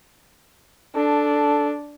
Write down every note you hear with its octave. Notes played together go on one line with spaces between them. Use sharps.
D4 A4